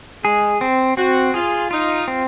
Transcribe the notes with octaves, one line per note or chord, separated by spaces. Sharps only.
G#3 G#4
C4
C4 F#4
F4 G#4
D#4 F4
C4